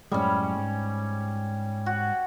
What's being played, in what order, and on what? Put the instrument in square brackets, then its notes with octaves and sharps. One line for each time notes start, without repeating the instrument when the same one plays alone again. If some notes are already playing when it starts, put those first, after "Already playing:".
[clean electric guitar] F#2 A2 G#3 [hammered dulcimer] G3 C#4
[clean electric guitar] G#2
[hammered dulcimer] F#4